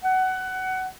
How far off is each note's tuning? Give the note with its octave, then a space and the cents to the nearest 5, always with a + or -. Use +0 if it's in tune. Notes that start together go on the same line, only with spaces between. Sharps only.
F#5 +20